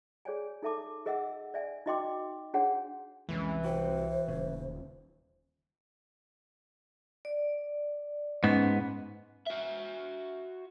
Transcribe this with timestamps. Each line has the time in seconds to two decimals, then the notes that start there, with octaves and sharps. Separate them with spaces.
0.25 G#4 C#5 D5 G#5
0.62 D#4 A4 E5 A5 D6
1.06 G#4 A#4 D#5 E5 F#5 E6
1.54 D5 E5 G#5
1.86 D#4 F#4 D#5 G5 C6 D6
2.54 D4 G#4 C#5 F#5 C6
3.29 C2 F2 E3 G#3 C#4
3.64 F#4 C5 G5
4.27 D#1 D2 C#3
7.25 D5
8.44 G#2 B3 C#4
9.47 F#4 E5